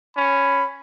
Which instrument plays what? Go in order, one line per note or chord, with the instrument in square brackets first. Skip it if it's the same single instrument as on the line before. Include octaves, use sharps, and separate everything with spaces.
[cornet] C#4 [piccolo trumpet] B5